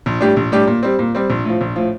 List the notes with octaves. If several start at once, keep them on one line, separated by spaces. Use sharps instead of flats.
A#1
A2 G3 D4 G4
A#1
A2 G3 D4 G4
A#2
G3 C4
A#2
G3 C4
A#1
A2 F3
A#1
A2 F3